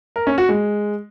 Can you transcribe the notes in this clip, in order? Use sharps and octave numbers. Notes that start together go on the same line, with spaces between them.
A#4
C#4
F#4
G#3